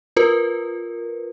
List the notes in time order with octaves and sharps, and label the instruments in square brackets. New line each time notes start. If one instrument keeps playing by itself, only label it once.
[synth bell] F4 A#4 B4